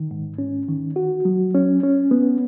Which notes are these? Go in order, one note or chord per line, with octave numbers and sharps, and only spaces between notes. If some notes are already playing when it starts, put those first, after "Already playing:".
Already playing: D#3
G#2
C#4
D#3
F#4
F#3
C#4
C#4
B3